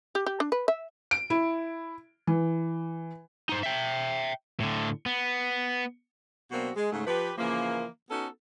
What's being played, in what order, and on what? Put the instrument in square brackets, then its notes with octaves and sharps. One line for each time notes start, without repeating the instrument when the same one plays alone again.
[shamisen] G4
G4
D4
B4
E5
[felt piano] D7
E4
E3
[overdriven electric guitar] D#4 C5
E5 G5
A2 D3
B3
[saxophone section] B2 F#3 A#3 C4 D4 F#4
G#3
G#2 C#3 A3
F3 G4 B4
C#3 E3 F3 A#3
B3 C#4 D#4 F#4 A4